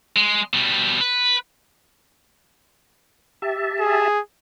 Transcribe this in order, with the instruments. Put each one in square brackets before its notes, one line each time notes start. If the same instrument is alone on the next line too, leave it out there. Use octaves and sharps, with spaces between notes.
[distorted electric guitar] G#3
B2 G3
B4
[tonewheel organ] G4 E5 A5
[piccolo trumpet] G#4